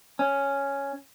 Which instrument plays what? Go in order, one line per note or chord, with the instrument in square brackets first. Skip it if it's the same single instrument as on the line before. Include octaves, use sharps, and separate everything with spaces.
[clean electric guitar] C#4